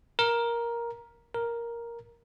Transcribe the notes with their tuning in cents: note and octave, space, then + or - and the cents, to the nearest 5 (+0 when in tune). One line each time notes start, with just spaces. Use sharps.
A#4 +10
A#4 +5